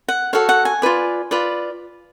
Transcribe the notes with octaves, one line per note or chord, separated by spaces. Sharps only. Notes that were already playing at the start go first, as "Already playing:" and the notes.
F#5
F#4 A4 C#5 F5
F#5
G#5
F4 B4 D5
F4 B4 D5